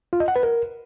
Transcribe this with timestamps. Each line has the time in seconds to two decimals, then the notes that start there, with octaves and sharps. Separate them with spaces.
0.13 F4
0.20 D#5
0.28 F#5
0.36 B4
0.43 A#4